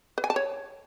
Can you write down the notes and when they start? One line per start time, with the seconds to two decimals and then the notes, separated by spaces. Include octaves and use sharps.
0.18 B4
0.24 G#5
0.30 A5
0.36 C#5